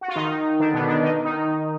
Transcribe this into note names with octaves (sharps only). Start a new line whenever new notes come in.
F#4
F4
D#3 D#4
D3 D4
B2 B3
D3 D4
D#3 D#4
D#3 D#4